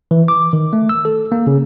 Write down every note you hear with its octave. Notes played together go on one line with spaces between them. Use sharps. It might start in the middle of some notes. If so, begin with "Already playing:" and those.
E3
D6
D#3
A3
E6
A4
A#3
C#3